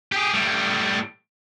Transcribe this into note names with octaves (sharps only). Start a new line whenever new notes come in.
G4 G#4
A2 G3